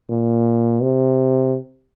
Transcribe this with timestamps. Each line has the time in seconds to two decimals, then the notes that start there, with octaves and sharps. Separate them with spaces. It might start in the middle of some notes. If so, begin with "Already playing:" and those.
0.10 A#2
0.83 C3